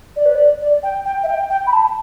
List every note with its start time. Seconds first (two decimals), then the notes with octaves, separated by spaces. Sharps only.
0.16 D5
0.26 B4
0.35 D5
0.61 D5
0.83 G5
1.06 G5
1.23 E5
1.28 G5
1.50 G5
1.67 B5
1.73 A5